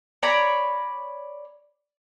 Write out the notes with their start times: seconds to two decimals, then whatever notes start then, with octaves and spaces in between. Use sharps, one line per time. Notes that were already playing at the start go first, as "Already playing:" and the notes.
0.23 C#5 D5 A#5 B5